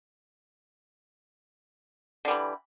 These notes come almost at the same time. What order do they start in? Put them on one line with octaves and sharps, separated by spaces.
D3 G3 E3